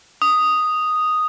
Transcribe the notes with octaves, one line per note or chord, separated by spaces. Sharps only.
D#6